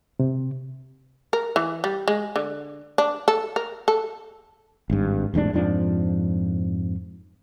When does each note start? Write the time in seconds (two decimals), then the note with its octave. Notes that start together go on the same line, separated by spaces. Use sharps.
0.20 C3
1.33 A#4
1.56 E3
1.84 G3
2.08 G#3
2.36 D3
2.98 D4
3.28 A4
3.56 A#4
3.88 A4
4.90 G#1 G2
5.34 E1 A1 G#2 D4
5.53 F2 G#2 F3 D4